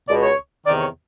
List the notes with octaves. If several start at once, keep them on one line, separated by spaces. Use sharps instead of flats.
C#2 B2 D5
C#5
E2 C3 D#3 D5
C#5